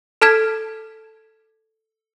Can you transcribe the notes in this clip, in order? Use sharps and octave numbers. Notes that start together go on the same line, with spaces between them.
A4 A5 F6 G#6 B6 E7